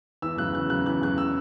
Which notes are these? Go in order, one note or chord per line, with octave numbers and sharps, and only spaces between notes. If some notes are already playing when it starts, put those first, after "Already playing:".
E2 E6
C#3 F#3 F#6
E2 F#6
C#3 F#3 F#6
E2 F#6
C#3 F#3 F#6
E6